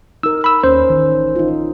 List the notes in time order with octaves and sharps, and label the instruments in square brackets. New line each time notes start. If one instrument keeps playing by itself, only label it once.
[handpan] D#4 A#4 [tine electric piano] E6
[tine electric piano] B5 E6
[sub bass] D#2 [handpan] C#4 [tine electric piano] C5
[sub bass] A1 [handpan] D#3
[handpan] D#4 F4